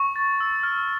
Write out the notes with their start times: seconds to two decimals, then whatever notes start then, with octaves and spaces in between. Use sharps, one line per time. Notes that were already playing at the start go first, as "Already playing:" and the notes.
Already playing: C#6
0.16 A6
0.40 E6
0.63 F6